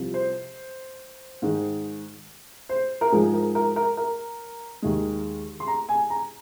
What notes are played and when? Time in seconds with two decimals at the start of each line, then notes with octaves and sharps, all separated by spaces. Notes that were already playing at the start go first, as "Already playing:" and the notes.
Already playing: C2 C3 F3
0.14 C5
1.42 G#2 D#3 G#3
2.69 C5
3.01 A#4
3.12 G#2 F3 G#3 G#4
3.34 A#4
3.55 A#4
3.76 A#4
3.97 A#4
4.82 D#2 D#3 G#3
5.60 C6
5.68 A#5
5.89 G#5
6.10 A#5